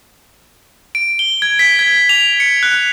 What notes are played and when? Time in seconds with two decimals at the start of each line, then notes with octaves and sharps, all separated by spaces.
0.95 D7
1.19 G7
1.42 G#6
1.59 B6
1.79 G#6
2.09 F7
2.40 C#7
2.63 F#6